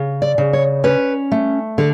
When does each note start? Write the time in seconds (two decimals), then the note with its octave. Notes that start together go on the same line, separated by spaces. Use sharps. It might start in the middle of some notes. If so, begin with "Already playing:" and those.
Already playing: C#3
0.22 D5
0.38 C#3
0.53 C#5
0.84 C#4 B4
1.32 A3
1.78 D3 A4